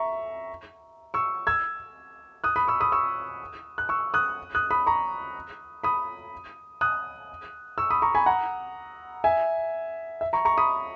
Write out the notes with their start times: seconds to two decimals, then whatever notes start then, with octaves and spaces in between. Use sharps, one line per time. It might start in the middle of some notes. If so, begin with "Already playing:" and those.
Already playing: E5 A#5 C#6
1.14 C#6 E6
1.47 E6 G#6
2.44 D#6 F#6
2.56 B5 D#6
2.68 C#6 E6
2.80 B5 D#6
2.92 C#6 E6
3.78 F#6
3.89 C#6 E6
4.14 D#6 F#6
4.55 D#6 F#6
4.71 B5 D#6
4.86 A#5 C#6
5.84 B5 D#6
6.81 D#6 F#6
7.78 C#6 E6
7.91 B5 D#6
8.02 A#5 C#6
8.15 G#5 B5
8.26 F#5 A#5
9.24 E5 G#5
10.21 E5
10.33 A#5 C#6
10.45 A#5 C#6
10.58 B5 D#6